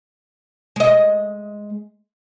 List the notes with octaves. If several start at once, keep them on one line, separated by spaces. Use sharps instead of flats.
G#3 D#5